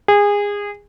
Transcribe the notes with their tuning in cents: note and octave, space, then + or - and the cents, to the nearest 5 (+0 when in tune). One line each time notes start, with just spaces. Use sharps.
G#4 -25